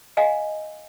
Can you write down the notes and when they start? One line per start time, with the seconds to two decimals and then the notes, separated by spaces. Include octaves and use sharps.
0.17 D#5 F5 G#5 A#5